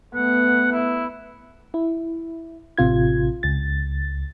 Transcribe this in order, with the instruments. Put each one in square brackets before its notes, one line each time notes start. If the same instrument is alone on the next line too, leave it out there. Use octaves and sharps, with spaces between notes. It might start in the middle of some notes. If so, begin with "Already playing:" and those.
[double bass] A3 B3 [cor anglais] F#5
[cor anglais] E4
[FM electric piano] E4
A1 C3 F4 G#6
C#2 A6